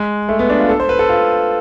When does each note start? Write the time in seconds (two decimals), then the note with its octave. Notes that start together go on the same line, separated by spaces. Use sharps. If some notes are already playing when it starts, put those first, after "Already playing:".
Already playing: G#3
0.29 A3
0.39 B3
0.50 D4
0.60 F4
0.69 A4
0.80 C5
0.89 B4
0.99 A4
1.09 F4